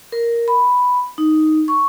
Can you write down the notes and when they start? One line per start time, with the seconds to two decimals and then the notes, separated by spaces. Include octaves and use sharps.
0.12 A#4
0.48 B5
1.18 D#4
1.68 C#6